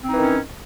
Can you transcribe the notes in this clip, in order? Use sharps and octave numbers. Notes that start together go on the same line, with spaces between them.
D#3 E3 C4 C#4 D#4